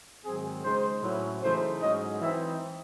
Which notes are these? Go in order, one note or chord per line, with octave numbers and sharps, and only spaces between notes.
G#2 D#3 F#3 C4 G#4
C#3 G#3 D#4 C5
A2 F#3 C#4 E4
C#3 E3 A3 D#4 C5
G#2 F#3 C#4 D#5
E3 C4 D#4 E5